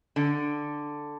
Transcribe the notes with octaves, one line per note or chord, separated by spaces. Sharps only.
D3